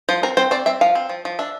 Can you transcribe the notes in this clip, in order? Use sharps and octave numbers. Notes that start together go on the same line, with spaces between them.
F3 C5
C4 A#4
C4 C5
C4 D5
C4 E5
F3 F5
C4
F3
F3
D4 E5